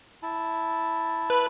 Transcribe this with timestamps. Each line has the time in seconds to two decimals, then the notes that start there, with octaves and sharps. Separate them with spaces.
0.23 E4 A5
1.30 B4